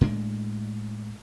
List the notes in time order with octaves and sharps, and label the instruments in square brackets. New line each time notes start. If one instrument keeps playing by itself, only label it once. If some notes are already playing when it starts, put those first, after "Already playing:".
[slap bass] A2 G#3 D4